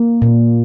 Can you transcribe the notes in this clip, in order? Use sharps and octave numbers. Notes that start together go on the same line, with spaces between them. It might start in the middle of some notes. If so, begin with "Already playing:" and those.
Already playing: A#3
A#2